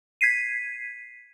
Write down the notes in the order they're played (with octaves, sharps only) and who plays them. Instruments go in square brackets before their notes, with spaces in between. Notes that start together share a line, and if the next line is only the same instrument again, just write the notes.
[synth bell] G#6 B6 C7 D#7